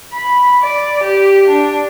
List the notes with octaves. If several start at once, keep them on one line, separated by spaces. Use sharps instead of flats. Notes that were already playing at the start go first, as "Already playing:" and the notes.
B5
D5
G4
D4